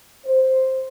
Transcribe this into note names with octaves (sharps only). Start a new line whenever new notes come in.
C5